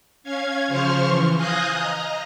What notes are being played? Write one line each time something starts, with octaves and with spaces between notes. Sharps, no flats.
C#4 F5 G#6
C#3 F3 C5 C6 C#6 F6
E3
F5 G#5 D#6 F#6 G6 A#6
D#5 A#5